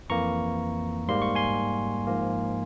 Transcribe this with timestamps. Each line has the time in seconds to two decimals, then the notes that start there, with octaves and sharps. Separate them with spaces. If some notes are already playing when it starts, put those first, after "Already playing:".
0.10 F2 E3 A#3 A#5 C#6
1.08 G#2 G3 A#3 C6
1.22 C#6
1.35 G#5 C6
2.07 G#2 F3 A#3